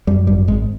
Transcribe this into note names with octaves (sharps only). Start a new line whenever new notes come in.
F#2 G3
G#1 G3
G#1 G#3